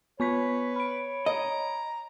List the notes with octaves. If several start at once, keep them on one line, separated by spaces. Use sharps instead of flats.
B3 B4 C#5 C#6 B6
B5 D7
D#5 A#5